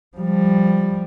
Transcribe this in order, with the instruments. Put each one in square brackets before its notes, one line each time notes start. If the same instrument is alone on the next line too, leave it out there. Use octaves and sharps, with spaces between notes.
[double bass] F3 G3